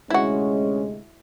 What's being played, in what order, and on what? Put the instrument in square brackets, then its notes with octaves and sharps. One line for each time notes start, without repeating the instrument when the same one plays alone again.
[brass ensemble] D2 C3 G#3 [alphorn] C#4 [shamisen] E4 F#4